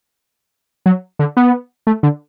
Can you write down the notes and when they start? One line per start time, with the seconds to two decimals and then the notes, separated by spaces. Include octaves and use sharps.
0.86 F#3
1.19 D3
1.37 B3
1.87 A3
2.03 D3